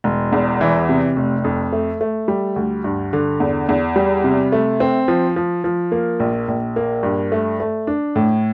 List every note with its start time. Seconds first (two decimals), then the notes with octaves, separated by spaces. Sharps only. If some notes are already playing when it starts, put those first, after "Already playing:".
0.04 E1
0.32 E2
0.61 E3
0.89 C3
1.16 F1
1.44 F2
1.73 A3
2.01 A3
2.28 G3
2.56 D2
2.84 G2
3.13 D3
3.40 E2
3.69 E2
3.96 G3
4.24 C3
4.52 A3
4.80 C4
5.08 F3
5.36 F3
5.64 F3
5.92 A#3
6.20 A#1
6.48 A#1
6.76 A#3
7.03 G2
7.32 A3
7.60 A3
7.87 D4
8.16 A2